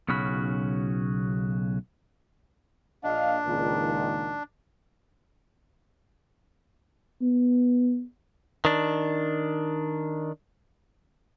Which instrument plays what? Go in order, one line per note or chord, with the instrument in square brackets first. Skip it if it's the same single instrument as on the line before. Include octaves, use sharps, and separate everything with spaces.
[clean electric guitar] B1 C#3 C#4 F#4 B5
[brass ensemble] A#1 D#5 F5 [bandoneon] D4
[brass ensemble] C#2 A#2 D#3
[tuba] B3
[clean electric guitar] D#3 D4